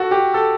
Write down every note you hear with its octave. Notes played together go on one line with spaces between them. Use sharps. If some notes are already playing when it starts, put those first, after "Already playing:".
Already playing: F#4 A4
G4
A4